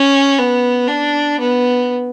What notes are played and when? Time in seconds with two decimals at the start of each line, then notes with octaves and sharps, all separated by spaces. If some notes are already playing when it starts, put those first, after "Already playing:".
Already playing: C#4
0.39 B3
0.88 D4
1.39 B3